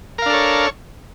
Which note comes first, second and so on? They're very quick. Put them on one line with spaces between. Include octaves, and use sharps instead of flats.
A#4 F5 D4 A4 C#5